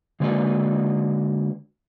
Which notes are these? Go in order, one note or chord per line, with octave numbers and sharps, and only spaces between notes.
D3 G#3 A#3 F#4 B4 D5